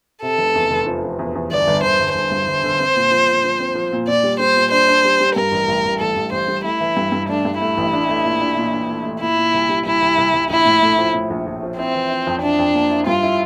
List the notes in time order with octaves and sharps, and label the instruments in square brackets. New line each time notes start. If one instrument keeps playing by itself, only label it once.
[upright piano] C3 [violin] A4
[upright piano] F1
E2
F1
F3
F3
E2
E2
[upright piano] G1 [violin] D5
[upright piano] G1
[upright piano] G1 [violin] C5
[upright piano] G1
[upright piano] G1 [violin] C5
[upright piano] G2
G1
D3
C4
A#2
F3
A#2
F3
C4
F3
A#2
[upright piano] A#2 [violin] D5
[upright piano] G3
[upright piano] G3 [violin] C5
[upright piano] A#2
[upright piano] D4 [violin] C5
[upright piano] D4
G3
G3
[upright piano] G2 [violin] A#4
[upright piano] A1
A1
A1
[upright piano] A1 [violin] A4
[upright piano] A1
[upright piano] A1 [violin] C5
[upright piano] G3
[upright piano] A3 [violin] E4
[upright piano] E3
G2
G2
[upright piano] A3 [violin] D4
[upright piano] G2
[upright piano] A3 [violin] E4
[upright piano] A1
D4
A3
A#2
D4
A#2
D4
A3
A3
[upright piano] A#2 [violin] E4
[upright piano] A#2
C2
G3
[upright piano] C2 [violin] E4
[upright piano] C2
C2
C2
[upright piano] A#1 [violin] E4
[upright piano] A2
A3
F3
A2
A#1
A#1
F3
[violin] C4 [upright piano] E4
[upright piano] E3
E4
F2
[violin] D4 [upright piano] E4
[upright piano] F2
A#3
E4
[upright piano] G2 [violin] F4
[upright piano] E4